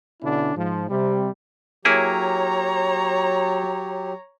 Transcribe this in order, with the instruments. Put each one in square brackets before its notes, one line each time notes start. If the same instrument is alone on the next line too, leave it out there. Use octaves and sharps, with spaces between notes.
[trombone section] B2 D3 C#4 D4 E4
G#2 F3
C3 G3
[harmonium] F#3 G4 [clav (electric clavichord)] A#3 E4 G#4 [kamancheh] C#5 A#5